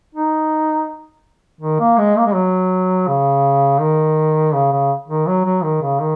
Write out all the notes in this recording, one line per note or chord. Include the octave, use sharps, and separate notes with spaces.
D#4
D#3
A#3
G#3
A#3
G#3
F#3
C#3
D#3
C#3
C#3
D#3
F#3
F#3
D#3
C#3
D#3